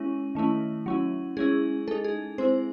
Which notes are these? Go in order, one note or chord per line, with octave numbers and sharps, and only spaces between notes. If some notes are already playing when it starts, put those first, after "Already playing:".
Already playing: G#3 C#4 E4
D#3 A3 C#4 E4
F#3 C#4 E4
G#3 C#4 E4 G#4
G#3 D#4 A4
G#4
G#3 C4 E4 C5